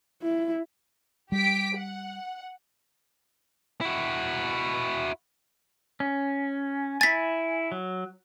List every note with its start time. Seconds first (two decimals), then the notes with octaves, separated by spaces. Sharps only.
0.23 E4
1.32 G3 G4 B6 D7
1.76 F#5
3.81 E4 F#4
6.00 C#4
7.01 E4 G#5 A6 B6
7.72 F#3